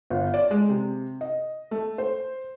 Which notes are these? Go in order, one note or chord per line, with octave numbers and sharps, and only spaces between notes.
G1
D5
G#3
C3
D#5
A3
C5